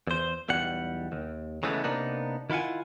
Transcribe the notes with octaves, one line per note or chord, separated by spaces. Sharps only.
E2 C5
B1 E2 G3 F#5
D#2
C#3 E3 G#3 A3 B3
C3 A#3 B3 D4 D#4
D#3 E4 F4 F#5 G#5